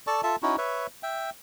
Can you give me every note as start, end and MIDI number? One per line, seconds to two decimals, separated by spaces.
0.07 0.21 69
0.07 0.21 74
0.07 0.21 81
0.07 0.21 85
0.23 0.36 65
0.23 0.36 69
0.23 0.36 76
0.23 0.36 81
0.42 0.56 61
0.42 0.56 63
0.42 0.56 64
0.42 0.56 66
0.58 0.87 71
0.58 0.87 73
0.58 0.87 76
1.03 1.30 76
1.03 1.30 79